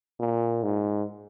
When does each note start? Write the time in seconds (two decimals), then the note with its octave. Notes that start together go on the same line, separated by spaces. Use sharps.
0.20 A#2
0.63 G#2